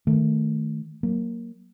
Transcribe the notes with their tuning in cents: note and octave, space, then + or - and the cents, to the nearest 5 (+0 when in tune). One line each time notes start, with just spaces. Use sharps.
D#3 +0 A3 +0
F#3 +0 A#3 +0